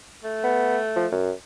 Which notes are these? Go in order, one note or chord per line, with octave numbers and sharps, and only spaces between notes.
A3
B3
F3
F#2